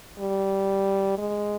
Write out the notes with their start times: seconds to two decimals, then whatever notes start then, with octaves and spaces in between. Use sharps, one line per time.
0.19 G3
1.18 G#3